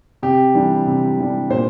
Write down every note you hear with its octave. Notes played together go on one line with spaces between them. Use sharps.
C3 G4
E3 G3 D4
C3
E3 G3 D4
A#2 C5